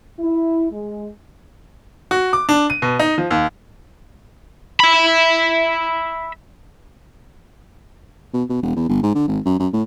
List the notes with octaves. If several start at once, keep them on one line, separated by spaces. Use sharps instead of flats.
E4
G#3
F#4
D6
D4
D#7
B2
D#4
F3
D#2
E5 B5
B2
B2
E1
E2
G1
G#2
D3
G#1
F#2
F#2
A2